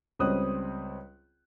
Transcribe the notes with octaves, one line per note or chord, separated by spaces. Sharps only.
C#2 G3 C4 C#5 D#6 F#6